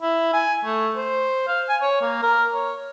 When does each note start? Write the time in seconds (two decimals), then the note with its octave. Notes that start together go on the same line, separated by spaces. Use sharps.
0.02 E4
0.33 G#5
0.65 A3
0.96 C5
1.48 F5
1.69 G#5
1.82 C#5
2.01 A#3
2.23 A#4
2.54 C#5